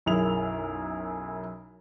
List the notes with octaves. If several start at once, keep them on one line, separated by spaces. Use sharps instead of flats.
B1 F#2 E4 G#4 A#4 F7